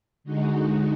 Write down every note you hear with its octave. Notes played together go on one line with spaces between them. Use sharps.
D3 G#3 D#4 F#4